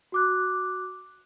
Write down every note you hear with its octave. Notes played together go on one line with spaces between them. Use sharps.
F#4 D6 F#6